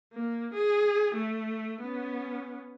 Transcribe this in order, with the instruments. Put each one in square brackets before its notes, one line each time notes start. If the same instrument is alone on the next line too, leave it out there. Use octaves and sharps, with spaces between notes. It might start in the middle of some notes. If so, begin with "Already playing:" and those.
[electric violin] A#3
G#4
A3
B3 C#4